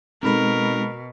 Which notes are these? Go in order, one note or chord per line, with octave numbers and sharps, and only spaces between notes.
B2 G#3 C4 D#4 A4 A#4 B5